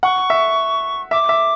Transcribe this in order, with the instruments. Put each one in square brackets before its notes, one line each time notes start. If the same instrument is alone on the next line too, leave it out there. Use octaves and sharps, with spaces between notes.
[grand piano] F#5 [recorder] C#6
[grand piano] E5
[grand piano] E5 [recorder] D6
[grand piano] E5